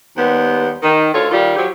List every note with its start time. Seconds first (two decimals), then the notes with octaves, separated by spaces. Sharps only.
0.17 D#2 G3 B3 C5
0.83 D#3
1.14 D2 F4 A4 C#5
1.30 D#3 G3 F4
1.56 F3 F#3 G4 C#5